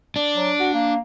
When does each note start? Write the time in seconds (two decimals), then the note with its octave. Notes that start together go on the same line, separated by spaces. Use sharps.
0.16 D4
0.36 F#3
0.60 F#4
0.74 A#3